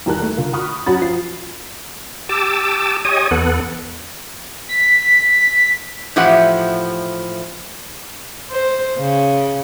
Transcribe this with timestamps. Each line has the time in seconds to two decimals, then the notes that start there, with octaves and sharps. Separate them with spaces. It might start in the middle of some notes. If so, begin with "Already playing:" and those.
0.06 E2 D#3 G3 A#4 A5 F#6
0.22 A3
0.37 D3 F4 A#4
0.53 B5 C#6 D#6 F6 F#6
0.86 F#3 C#4 F#4 B5 A6
1.02 F3 F4 C7
2.29 G4 A5 D6 E6
3.05 G4 C#5 D#5 G#5 D#6
3.31 E2 B3 A4 F#5
4.69 B6
6.16 A2 E3 F3 E4 G4 F#5
8.51 C5
8.99 C#3